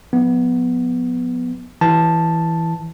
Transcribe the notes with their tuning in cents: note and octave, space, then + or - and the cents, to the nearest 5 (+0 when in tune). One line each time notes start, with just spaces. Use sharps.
F3 +45 B3 +0
E3 +0 A5 +0